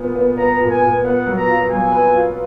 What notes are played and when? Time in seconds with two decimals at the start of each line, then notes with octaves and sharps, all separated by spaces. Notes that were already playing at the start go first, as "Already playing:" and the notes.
Already playing: A#2 B3
0.15 B3
0.37 B3 A#5
0.60 A#2
0.70 G#5
0.81 A#2
1.04 B3 F#5
1.26 F#3
1.37 A#5
1.48 F4
1.70 F#3 G#5
1.92 B4
2.14 F4